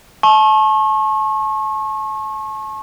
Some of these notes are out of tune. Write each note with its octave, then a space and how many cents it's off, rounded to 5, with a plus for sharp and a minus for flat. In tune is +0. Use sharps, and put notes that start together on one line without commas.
A5 -30 C#6 -35